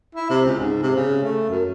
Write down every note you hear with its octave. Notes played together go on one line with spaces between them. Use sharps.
E4
C3
C#2
G#2
C3
C#3
A3
F#2